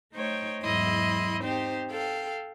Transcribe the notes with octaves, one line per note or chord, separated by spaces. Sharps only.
A3 D#4 C5 C#5 G5 C#6
E2 G#2 F#3 E4 D#5 C6
C4 D#4 G4 C5
A4 F5 G5